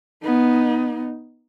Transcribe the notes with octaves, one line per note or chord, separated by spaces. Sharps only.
B3 D#4